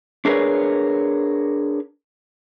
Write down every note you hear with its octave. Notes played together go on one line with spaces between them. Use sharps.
D4 G#4 A#4 B4 C#5